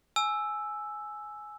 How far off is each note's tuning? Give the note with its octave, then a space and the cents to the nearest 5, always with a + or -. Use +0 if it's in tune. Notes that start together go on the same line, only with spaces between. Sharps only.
G#5 +15 E6 +0